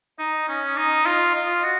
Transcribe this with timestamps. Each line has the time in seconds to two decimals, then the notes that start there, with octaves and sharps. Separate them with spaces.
0.19 D#4 D#5
0.48 C#4
0.77 D#4
1.06 F4
1.35 F4
1.64 F#4